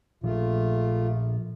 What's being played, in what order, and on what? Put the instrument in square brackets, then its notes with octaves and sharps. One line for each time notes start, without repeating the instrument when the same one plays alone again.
[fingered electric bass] A#2 F3 [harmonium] A3 F4